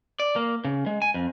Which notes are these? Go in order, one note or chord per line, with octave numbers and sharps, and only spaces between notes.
D5
A#3
C#3
G#3
G#5
F2